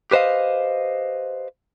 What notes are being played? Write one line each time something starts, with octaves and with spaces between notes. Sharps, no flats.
G4 B4 C5 D#5 F5